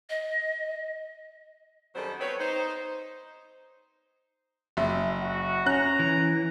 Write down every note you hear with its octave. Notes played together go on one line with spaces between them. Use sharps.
D#5
F#2 D#3 F#3 G3 A4 C5
A3 B3 C4 B4 C#5
D#4 C5
F#1 E5
F#4
C#4 A#5 F#6
E3